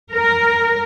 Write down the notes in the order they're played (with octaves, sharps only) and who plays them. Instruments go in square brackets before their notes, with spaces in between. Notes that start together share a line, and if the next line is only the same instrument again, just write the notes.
[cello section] A#4